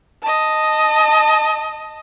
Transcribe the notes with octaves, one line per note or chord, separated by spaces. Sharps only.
D#5 A5